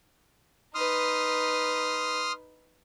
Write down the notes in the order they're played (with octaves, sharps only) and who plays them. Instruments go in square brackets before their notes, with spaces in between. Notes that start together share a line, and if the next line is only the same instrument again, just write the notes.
[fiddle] D#4 B4 [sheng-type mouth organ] C6 D#6 F6